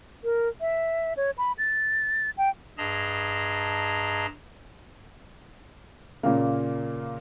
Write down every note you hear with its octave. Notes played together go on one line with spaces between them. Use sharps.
A#4
E5
C#5
B5
A6
G5
G2 G#4 D#5 A5 A#5
A#2 C#3 A#3